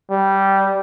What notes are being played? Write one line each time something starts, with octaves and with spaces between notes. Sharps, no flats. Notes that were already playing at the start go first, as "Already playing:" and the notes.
G3